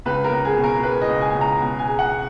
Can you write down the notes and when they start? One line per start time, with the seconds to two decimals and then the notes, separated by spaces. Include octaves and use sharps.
0.06 C#2 B4
0.24 A#4
0.32 C#2
0.45 G#4
0.57 B2
0.64 A#4
0.82 G#3 B4
1.02 D#5
1.09 C#2
1.21 G#5
1.35 C#2
1.41 A#5
1.59 B2
1.79 G#5
1.86 G#3
1.99 F#5